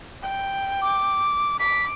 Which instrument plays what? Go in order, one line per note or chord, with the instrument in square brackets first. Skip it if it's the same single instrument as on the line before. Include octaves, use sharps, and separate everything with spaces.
[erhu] G5
[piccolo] D6
[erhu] D6 [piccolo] B6